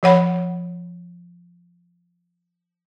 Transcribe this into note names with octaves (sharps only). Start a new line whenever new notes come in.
F3 C#5 F#5 B5